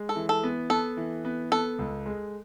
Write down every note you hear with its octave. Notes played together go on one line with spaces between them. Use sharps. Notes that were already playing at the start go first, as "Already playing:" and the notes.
Already playing: G#3
A4
E3
A4
B3
B3 A4
E3
B3
B3 A4
C#2
G#3